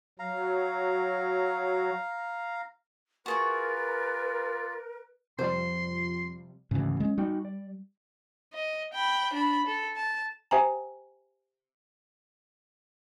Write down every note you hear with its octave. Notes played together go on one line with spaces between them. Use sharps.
F#3 F5 A#5
F4 F#4 G#4 A#4 B4 D5 C#6
F2 C3 F3 G3 C5 C6
D2 G#2 C#3 E3
G#3 C#4
G3 D#4 F#4 G5
D5
D#5
G5 B5
D4 B5
A4
A5
G4 C5 E5 G5 G#5 A#5